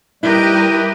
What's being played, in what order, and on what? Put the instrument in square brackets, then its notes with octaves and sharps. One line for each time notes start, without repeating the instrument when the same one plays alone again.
[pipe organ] G3 [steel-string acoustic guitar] E4 [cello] G4 A#4 [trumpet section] B4 D#5 G5